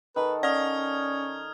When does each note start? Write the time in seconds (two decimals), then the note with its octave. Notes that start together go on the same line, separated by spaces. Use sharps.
0.16 D#3 A4 B4
0.43 C#4 D5 D#6 F6 G#6